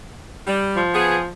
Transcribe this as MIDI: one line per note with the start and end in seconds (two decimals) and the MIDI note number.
0.47 0.81 55
0.76 1.30 53
0.94 1.18 59
0.94 1.18 68